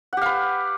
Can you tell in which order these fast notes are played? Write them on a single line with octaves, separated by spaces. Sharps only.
F#5 G4 F5 B4